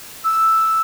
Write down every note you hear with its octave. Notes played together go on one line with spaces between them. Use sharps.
E6